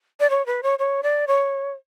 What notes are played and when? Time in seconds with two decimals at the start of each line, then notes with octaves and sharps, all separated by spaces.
0.20 D5
0.30 C#5
0.46 B4
0.63 C#5
0.79 C#5
1.03 D5
1.28 C#5